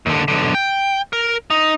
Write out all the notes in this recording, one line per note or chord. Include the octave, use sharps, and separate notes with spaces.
D#2 D3
B1 D3
G5
A#4
D#4